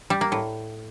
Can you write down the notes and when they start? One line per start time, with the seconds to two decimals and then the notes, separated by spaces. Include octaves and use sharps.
0.10 G3
0.21 A#3
0.32 A2